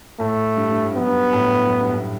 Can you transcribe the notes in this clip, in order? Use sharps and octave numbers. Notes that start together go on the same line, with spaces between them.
A2 A3
G2
G2
A2
G2
F#2 B3
G2
A2
F#2
G2
A2